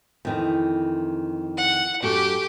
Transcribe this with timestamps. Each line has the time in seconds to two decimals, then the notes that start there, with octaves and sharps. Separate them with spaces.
0.25 F2 D#3 E3
1.58 F#5
2.03 F#2 F#4 G4 A4